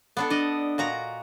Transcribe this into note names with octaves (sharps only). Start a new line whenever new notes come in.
B3 D4 A4
D4 D5 D#5
A#2 F#4 A#5